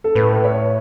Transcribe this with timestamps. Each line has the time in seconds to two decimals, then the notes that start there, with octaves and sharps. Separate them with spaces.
0.04 A4
0.15 A2 B4
0.33 B4
0.44 C#5